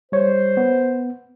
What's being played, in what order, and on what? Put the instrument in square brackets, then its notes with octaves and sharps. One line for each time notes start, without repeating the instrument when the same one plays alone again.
[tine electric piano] G3 C#5 [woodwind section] C5
[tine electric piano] B3